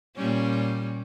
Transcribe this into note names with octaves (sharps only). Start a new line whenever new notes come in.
A#2 G3 C#4